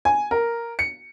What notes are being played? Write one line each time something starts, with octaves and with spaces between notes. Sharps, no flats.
G#5
A#4
C#7